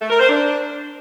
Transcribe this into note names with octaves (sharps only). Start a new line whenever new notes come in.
A3
A#4
C5
D4